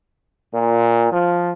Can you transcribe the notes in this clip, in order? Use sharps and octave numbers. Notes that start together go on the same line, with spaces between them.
A#2
F3